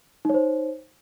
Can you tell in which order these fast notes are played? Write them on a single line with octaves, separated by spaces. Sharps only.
D#4 C#5 C5